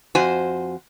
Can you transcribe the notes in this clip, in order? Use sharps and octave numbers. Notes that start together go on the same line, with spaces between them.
F2 F#4 C5 G#5